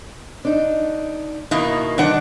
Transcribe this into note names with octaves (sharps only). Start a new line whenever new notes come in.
D4 D#4
B2 D#3 A#3 E4
G2 D#3 D4 D5 F#5